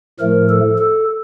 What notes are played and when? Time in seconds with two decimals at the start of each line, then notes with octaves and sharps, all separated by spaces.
0.19 A2 F3 A3 A#4
0.49 A4
0.78 A4